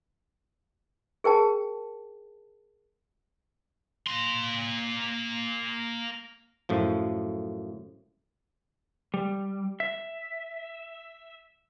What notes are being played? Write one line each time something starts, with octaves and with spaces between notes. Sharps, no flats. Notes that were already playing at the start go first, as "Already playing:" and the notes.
G#4 A#4 G5 A5
A#3 C6
F#2 A2 F3
G3
E5